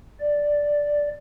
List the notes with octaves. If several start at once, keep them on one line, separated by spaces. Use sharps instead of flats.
D5